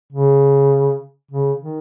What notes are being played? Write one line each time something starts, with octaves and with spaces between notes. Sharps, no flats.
C#3
C#3
D#3